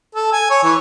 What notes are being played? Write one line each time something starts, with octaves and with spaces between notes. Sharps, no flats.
A4
G#5
C#5
E3